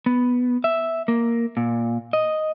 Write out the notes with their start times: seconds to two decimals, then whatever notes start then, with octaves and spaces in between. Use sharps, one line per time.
0.06 B3
0.64 E5
1.08 A#3
1.57 A#2
2.13 D#5